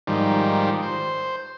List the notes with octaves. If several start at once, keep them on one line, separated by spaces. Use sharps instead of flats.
G#2 D#3 F3 G3
C5